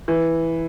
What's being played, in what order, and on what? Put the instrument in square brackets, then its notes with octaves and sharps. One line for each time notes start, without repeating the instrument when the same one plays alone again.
[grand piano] E3